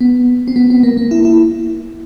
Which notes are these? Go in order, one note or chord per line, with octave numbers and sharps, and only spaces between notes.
B3
C4
B3
B3
A#3
A#3
E4
E4